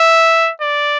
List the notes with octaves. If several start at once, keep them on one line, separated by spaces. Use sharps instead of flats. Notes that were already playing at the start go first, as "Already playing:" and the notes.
Already playing: E5
D5